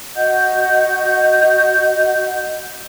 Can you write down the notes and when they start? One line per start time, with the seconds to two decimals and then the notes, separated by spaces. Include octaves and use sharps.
0.15 F#4 D#5 F#5 G6